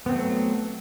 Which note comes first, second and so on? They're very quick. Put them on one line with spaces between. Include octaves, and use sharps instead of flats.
B3 C4 A3 F#3